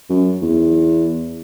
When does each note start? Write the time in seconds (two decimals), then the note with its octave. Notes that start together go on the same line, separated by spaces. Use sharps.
0.10 F#2
0.41 E2